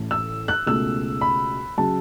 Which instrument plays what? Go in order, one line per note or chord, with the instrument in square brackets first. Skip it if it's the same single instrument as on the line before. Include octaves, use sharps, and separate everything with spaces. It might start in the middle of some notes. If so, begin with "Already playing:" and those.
Already playing: [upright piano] A1 A2 A3
E6
F#6
C#2 B2 A3 E6
B5
C#3 F#3 A5